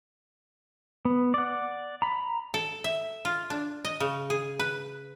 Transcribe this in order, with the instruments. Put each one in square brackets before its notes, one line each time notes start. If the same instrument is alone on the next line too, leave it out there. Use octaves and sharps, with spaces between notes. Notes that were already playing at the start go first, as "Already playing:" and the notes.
[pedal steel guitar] B3
D5 F#5
A#5 B5
[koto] A4
E5
F4
D4
D#5
C#3
G#4
B4